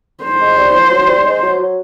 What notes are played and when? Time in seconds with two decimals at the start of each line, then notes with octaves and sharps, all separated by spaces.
0.24 C5
0.41 G#3
0.57 G3
0.74 F3
0.91 F#3
1.08 G3
1.25 G#3
1.42 F#3
1.59 F#3